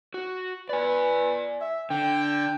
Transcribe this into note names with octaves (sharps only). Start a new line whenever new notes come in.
F#4
B4 D5 G#5
E5
D3 G5